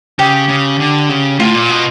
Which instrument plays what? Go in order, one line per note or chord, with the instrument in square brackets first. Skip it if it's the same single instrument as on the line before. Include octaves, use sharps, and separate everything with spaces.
[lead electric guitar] C#3 [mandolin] G4
[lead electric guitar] C#3
D3
C#3
[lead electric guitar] A2 [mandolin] F4
[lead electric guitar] A#2
B2